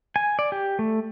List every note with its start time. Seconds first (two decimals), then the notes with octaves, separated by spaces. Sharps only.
0.16 G#5
0.39 D5
0.52 G4
0.79 A3